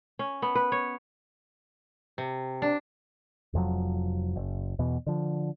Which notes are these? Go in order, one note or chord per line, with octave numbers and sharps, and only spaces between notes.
C#4
B3
B4
C#5
C3
D4
F1 F2 F3 F#3
F#1
E2 B2
D3 F3